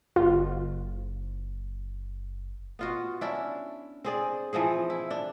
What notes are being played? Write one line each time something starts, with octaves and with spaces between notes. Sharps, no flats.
F#1 F4
B3 F4 F#4
C#4 D4 E4
C4 G#4 D5
E3 F3 C4 G#4
E4
D4